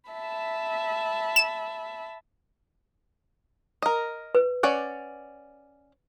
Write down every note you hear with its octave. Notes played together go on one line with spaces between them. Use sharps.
E5 A5 B5
E7
A#4 D#5
B4
C#4 D5 F#5